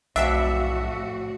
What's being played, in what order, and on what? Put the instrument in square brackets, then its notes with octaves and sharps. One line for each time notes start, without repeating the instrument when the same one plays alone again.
[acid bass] B1 [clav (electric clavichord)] F2 D4 [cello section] A2 F#4 [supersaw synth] E5